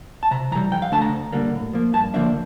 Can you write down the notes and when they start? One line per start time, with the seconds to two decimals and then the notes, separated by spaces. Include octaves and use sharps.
0.23 A5
0.31 C3 A#5
0.51 E3 A#5
0.55 G3
0.71 F2 G5
0.82 F5
0.92 D3 A3 D4 A5
1.02 A#5
1.13 D2
1.32 D3 G3 A#3 D4
1.54 A2
1.73 F3 A#3
1.93 G2 A5
2.14 D3 F3 A#3 D4 E5